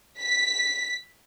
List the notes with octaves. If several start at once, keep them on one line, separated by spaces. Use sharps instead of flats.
B6